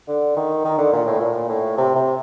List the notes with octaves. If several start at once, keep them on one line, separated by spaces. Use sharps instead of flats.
D3
D#3
D#3
D3
A#2
A2
A#2
A2
C3
C3